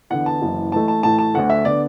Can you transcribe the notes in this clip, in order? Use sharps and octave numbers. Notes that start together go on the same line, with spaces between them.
E2 D3 B3 F#5
A5
F#1 F#2 E3
A1 A2 A3 A5
A5
A1 A2 A3 A5
A5
D2 D3 A3 F#5
E5
D3 B3 D5